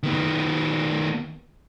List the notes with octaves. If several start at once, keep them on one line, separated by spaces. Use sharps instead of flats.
D#3 B3